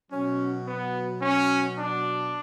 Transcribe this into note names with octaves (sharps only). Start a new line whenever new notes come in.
B2 F#3 C#4
B3
C#4
D4